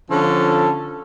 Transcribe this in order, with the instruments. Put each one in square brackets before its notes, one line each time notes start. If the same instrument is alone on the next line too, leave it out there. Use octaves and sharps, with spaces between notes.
[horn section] D3 F3 C#4 A4